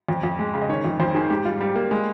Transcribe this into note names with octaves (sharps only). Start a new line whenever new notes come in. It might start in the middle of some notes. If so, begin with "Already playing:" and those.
F2
F2
G#3
C#3
D#5
D#3 C#5
F2
F2 C5
D#3 G#4
G#2 G4
G3 F4
G3 G4
A#3
G#3